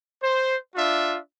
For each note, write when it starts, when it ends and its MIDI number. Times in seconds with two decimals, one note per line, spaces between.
0.22 0.55 72
0.76 1.17 62
0.76 1.17 65
0.76 1.17 76